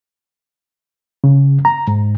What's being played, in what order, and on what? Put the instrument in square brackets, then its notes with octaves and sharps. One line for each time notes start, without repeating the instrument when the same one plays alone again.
[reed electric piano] C#3
A#5
G#2